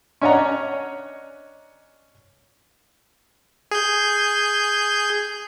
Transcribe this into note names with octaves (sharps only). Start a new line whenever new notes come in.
C#4 D4 C#5 D#5 F#5 A#5
G#4 G6